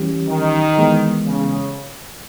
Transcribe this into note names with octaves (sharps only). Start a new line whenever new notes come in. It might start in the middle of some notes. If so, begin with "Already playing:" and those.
Already playing: E3 G3 C#4 G4
D#3
E3 G#3 B3
C#3